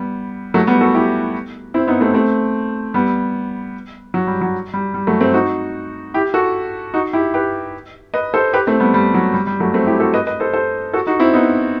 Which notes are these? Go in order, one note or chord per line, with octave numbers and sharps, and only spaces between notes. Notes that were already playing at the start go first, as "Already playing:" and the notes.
Already playing: G3 B3
F#3 A3
G3 B3
F#4 A4
E4 G4
C4 E4
B3 D#4
A3 C4
A3 C4
G3 B3
F#3
G3
F#3
G3
G3
F#3 A3
A3 C4
D#4 F#4
E4 G4
F#4 A4
D#4 F#4
E4 G4
G4 B4
B4 D#5
A4 C5
G4 B4
A3 C4
G3 B3
G3
F#3
G3
G3
F#3 A3
A3 C4
E4 G4
F#4 A4
B4 D#5
B4 D#5
A4 C5
A4 C5
F#4 A4
D#4 F#4
C4 E4
B3 D#4